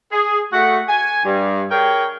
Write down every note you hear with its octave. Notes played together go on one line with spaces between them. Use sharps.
G#4
A3 F#4 F#5
G#5
G2
G#4 A#4 C#5 G5